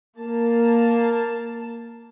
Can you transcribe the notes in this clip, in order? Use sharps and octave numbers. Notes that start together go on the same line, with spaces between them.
A#3 A5